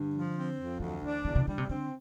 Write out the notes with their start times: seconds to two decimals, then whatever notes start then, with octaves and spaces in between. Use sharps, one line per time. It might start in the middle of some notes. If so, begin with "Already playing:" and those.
Already playing: G2 D3
0.14 F3
0.37 C4
0.58 F2
0.80 D2 E3
1.02 E3 D4
1.25 E2 D3
1.35 C3
1.47 D3 G3
1.58 C3
1.69 D3 C4